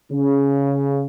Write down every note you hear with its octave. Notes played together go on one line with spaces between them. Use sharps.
C#3